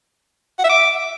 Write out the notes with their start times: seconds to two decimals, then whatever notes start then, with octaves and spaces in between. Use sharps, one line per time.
0.59 F#5
0.64 E5
0.70 D6